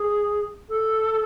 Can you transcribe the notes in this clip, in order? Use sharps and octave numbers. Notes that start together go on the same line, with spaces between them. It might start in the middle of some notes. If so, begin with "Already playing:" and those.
Already playing: G#4
A4